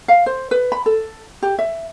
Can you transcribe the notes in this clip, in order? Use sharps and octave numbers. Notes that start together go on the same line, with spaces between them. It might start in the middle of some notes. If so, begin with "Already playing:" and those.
F5
C5
B4
B5
A4
G4
E5